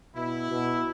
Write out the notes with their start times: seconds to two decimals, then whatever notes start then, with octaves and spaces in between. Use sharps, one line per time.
0.15 B2 E4
0.51 B2